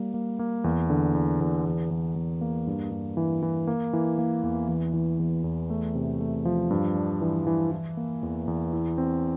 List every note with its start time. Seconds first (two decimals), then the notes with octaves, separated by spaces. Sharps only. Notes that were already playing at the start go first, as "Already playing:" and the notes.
Already playing: G3 A#3
0.14 A#3
0.39 A#3
0.64 E2
0.90 D3
1.15 E2
1.41 E2
1.66 E2
1.91 E2
2.16 E2
2.41 A#3
2.67 G2
2.91 G2
3.17 E3
3.43 E3
3.67 A#3
3.93 E3
4.18 A#3
4.43 E2
4.69 E3
4.93 E3
5.19 E2
5.44 E2
5.70 A3
5.95 C3
6.20 A3
6.45 F3
6.71 G2
6.95 D4
7.21 E3
7.47 E3
7.72 E3
7.97 A#3
8.23 E2
8.48 E2
8.73 E4
8.98 C4